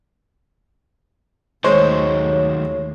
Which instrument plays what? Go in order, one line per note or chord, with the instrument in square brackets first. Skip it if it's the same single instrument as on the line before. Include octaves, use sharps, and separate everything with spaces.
[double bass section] D#2 A3 [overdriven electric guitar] D#3 F#3 [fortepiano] G#3 C5 [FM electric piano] C#5